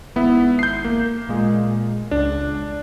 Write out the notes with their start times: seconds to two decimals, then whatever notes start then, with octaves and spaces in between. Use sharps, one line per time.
0.16 G#1 B3 E4 E5
0.59 G6 C7
0.85 A#3
1.29 A#2 G#3
2.11 C#2 D4